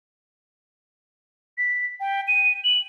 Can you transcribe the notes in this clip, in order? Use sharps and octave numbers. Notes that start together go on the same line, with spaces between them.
B6
G5
D#7
F#7